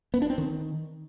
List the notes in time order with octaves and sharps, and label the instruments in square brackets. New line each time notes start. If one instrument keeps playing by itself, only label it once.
[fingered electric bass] B3
D4
C4
D#3